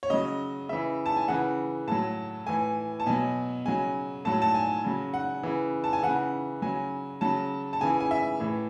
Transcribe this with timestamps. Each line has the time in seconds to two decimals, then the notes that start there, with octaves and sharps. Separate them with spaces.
0.03 C#5
0.10 C#3 F#3 D#5
0.69 C#3 E3 E5
1.06 A5
1.17 G#5
1.28 C#3 E3 F#5
1.88 A2 F#3 A5
2.47 A2 E3 G#5
3.00 A5
3.06 B2 F#3 G#5
3.66 C#3 F#3 G#5
4.25 A2 F#3 A5
4.42 A5
4.55 G#5
4.85 C#3 F#3
5.14 F#5
5.43 C#3 E3
5.84 A5
5.93 G#5
6.03 C#3 E3 F#5
6.62 C#3 F#3 G#5
7.21 C#3 F#3 A5
7.73 A5
7.81 C#3 E3 G#5
8.00 G#5
8.11 E5
8.40 A2 E3